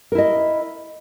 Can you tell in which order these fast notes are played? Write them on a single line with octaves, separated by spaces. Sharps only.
A#4 E4 D#5